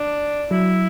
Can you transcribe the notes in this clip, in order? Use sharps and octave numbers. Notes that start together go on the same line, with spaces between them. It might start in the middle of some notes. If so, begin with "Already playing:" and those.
Already playing: D4
F#3 E4